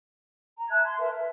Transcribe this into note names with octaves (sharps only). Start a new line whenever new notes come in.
A#5
E5 A5 F#6 G#6
C6
A#4 B4 E5 A5
E5